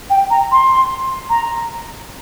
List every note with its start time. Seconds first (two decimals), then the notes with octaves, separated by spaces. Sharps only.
0.10 G5
0.30 A#5
0.52 C6
1.30 A#5